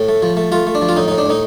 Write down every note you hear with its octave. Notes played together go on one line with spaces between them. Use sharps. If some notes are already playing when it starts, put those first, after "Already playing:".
Already playing: A2 A4
A3
F3
A3
A3 F4
A3
D4
F3
F4
A2 D#4
A2 D#4
D4
A2 D#4